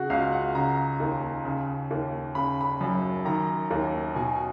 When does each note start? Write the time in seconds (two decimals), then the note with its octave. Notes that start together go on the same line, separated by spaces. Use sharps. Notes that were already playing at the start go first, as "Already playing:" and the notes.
Already playing: C#3 F#4 G#4
0.10 C#2 F5
0.32 F#5
0.55 C#3 A#5
1.00 D#2
1.45 C#3
1.91 D#2
2.35 C#3 B5
2.61 B5
2.81 F#2
3.25 D#3 A#5
3.71 D#2
4.15 B2 G#5